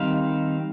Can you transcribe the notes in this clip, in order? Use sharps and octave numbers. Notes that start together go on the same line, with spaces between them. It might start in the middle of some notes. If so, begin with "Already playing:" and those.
Already playing: D#3 G3 C4 D#4 F5